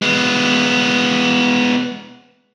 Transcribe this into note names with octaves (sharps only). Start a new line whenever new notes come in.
G#3 B3